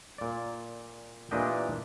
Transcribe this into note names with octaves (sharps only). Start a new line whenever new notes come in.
A#2 D5
A#2 E3 D4 G4 D#5 G5